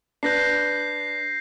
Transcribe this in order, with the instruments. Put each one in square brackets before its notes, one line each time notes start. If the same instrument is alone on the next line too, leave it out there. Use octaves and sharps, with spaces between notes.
[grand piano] D4 B4 [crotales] G6 A#6 C7